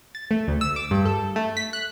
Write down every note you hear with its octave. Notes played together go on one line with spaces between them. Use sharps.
A6
A3
D2
E6
D6
G2
A4
A3
B6
F#6